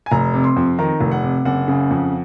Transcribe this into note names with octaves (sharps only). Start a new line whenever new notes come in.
G#5
F1 A#5
C3
C6
F2
D#3 A#5
F1
F#5
C3
F#1 F#5
C#3
F2